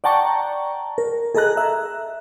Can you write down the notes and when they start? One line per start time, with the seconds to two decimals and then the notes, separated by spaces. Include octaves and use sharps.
0.04 D5 F#5 G5 A5 A#5 C#6
0.98 A#4
1.35 G#4 A4 D#5 A#5 F#6
1.57 E5